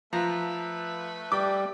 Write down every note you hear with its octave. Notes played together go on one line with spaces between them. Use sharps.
F3 A3 B4 A#5
G3 G4 D5 D6